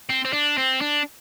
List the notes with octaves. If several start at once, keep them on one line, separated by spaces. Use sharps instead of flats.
C4
C4
D4
C4
D4